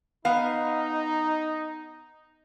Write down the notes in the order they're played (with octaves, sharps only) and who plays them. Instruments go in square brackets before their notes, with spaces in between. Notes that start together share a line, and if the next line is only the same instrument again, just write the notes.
[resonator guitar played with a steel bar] B3 F5 [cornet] D#4